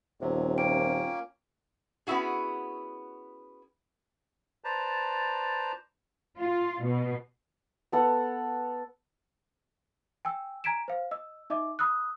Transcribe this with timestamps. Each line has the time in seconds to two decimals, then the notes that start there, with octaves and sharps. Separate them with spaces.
0.21 D#1 C3 F#3
0.57 A#3 C#4 F4 G5 D7
2.07 B3 C#4 E4 F#4 G#4
4.64 B4 C5 D5 A5 A#5
6.38 F4
6.83 B2
7.92 B3 A4 F#5
10.25 G5 G#5 E6
10.64 G#5 A#5 G#6 B6 D7 E7
10.88 C5 F5
11.11 D#5 E6
11.50 D#4 D#5 E5 D6
11.79 B5 D#6 E6 F#6